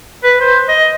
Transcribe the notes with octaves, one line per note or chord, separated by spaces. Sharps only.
B4
C5
D#5